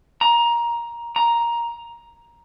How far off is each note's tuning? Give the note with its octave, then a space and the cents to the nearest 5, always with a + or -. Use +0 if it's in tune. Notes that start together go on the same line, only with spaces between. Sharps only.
A#5 +15
A#5 +10